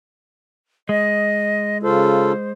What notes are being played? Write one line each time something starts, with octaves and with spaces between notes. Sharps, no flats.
G#3 D#5
C#3 F4 A4 C5